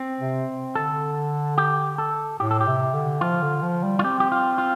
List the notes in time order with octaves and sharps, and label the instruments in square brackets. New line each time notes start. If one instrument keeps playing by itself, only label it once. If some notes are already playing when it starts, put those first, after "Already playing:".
Already playing: [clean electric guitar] C4
[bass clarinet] C3
[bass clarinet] D3 [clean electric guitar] A4
[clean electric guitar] G4
A4
[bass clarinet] A2 [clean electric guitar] G4
[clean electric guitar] A4
G4
[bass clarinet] C3
D3
[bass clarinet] F3 [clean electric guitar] F4
[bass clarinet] D3
F3
G3
[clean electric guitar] F4
[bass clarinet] C4 [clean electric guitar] G4
[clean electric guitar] G4
F4
F4